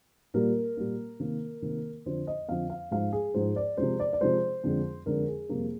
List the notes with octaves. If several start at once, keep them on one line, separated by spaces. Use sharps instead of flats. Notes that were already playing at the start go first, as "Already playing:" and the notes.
A#2 G3 A#3 A#4
A#2 G3 A#3
C3 D#3 A#3
C3 D#3 A#3
F2 D3 F3 C5
D#5
F2 D3 F3 F5
F5
G#2 F3 G#3 F5
G#4
G#2 F3 G#3 C5
D5
C3 F3 G#3 C5
D5
D5
C3 F3 G#3 C5
F2 D3 G#3
F2 D3 G#3 A#4
G#4
F2 C3 G3 A#3